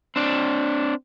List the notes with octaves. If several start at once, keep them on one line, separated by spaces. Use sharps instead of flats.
C4 D4